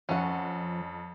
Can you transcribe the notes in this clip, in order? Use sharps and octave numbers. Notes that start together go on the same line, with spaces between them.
F2 F3 C#4 F#5